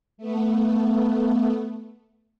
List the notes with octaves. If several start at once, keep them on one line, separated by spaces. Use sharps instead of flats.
A3 B3